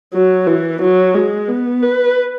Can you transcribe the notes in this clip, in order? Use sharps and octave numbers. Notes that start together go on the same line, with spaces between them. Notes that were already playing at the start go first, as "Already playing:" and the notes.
F#3
E3
F#3
G#3
B3
B4